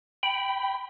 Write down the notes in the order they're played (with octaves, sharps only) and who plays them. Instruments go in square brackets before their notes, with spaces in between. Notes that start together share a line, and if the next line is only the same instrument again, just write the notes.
[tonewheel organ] G5 B5